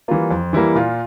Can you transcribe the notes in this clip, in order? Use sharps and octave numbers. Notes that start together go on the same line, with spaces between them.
E3 G3 A#3 F4
F2
E3 G3 A#3 E4
A#2 F4